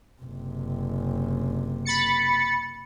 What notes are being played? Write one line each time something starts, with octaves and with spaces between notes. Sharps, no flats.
F#1 C3
B5 A6 C#7